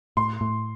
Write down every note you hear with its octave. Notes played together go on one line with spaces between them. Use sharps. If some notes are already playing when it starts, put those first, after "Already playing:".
A2 C6
A2